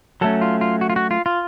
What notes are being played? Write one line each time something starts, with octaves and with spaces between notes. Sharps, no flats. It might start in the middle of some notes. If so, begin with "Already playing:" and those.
F#3 A3 C#4 A4
F4
F4
F#4
F4
F#4
F4
F4